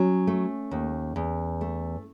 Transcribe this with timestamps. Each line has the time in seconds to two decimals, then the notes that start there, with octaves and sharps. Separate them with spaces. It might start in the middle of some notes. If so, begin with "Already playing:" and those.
Already playing: F#3 C#4
0.27 A3
0.71 D#2
1.16 E2
1.61 A3